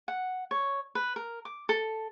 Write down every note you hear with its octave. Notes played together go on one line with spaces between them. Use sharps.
F#5
C#5
B4
A#4
D6
A4